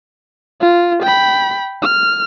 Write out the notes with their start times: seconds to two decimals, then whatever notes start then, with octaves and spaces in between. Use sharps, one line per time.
0.61 F4
1.02 G5 B5
1.82 F6